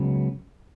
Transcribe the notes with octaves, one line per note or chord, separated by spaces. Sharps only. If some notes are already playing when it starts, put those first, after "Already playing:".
Already playing: C#2 C#3 F#3 B3